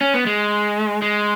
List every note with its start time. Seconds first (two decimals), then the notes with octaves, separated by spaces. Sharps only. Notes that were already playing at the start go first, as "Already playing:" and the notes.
0.01 C#4
0.14 B3
0.26 G#3
1.02 G#3